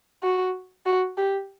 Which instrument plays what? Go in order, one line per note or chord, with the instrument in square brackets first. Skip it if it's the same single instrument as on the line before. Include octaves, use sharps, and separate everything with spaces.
[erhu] F#4
F#4
G4